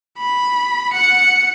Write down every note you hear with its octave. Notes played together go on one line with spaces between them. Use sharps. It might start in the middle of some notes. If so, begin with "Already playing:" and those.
B5
F#5 C#7